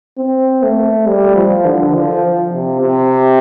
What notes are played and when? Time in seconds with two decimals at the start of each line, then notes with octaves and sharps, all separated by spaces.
0.18 C4
0.63 A3
1.07 G3
1.35 F3
1.65 D3
1.94 F3
2.52 C3
2.81 C3